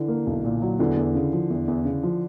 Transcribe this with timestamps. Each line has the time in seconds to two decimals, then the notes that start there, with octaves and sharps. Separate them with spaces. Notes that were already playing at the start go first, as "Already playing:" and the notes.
Already playing: D3 E3
0.08 A#3
0.27 B1
0.44 A#2
0.62 F#3
0.79 E2 D3 E3
0.97 E2
1.15 C#3
1.33 F3
1.50 E2
1.68 E2
1.85 C#3
2.03 F3